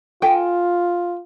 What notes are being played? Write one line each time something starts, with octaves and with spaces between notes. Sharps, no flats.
F4 A4 G5 G#5